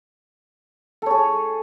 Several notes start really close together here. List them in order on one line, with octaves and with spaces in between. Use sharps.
A4 C#5 G#4